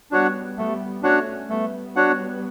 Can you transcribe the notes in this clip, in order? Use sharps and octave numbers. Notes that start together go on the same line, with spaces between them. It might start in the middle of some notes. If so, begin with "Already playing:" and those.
G3 B3 D4 F#4 C#5 F#5
G3 A3 B3
A3 C#4 D4 F#4 C#5 F#5
G3 A3 B3
D4 F#4 C#5 F#5